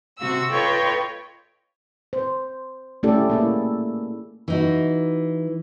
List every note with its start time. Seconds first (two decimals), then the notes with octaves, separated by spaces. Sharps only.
0.19 C3 F#4 E6
0.52 F4 A4 B4 C#5 D#5 G5
2.13 C5
3.03 A3 C#4 E4 G4 A4 D5
3.30 A#3 E4 G#4
4.48 E3 D#4 F#4